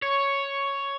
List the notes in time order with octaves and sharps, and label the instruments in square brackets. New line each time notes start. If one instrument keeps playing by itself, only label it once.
[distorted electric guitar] C#5